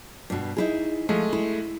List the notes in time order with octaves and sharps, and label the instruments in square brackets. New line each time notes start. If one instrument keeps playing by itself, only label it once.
[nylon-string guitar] G2 B2
D#4 E4 G#4
[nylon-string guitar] F3 [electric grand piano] G#3 A3
[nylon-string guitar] E4